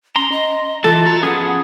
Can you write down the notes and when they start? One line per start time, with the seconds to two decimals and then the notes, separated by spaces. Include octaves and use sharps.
0.16 C#4 A#5 C6
0.32 D#5
0.84 E3 F4 A4 A5
1.05 F#4 A#5
1.23 F3 B3 C#4 G#4 F#5